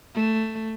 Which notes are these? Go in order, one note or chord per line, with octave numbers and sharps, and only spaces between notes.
A3